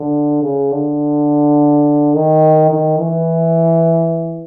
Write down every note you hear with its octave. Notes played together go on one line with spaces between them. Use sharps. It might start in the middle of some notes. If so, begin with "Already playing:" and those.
Already playing: D3
C#3
D3
D#3
D#3
E3